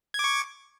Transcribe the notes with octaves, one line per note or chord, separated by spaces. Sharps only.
C#6 D6 G#6